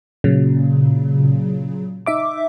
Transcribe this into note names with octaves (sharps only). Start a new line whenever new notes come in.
A#2 C#3 F#3
D#4 E5 D6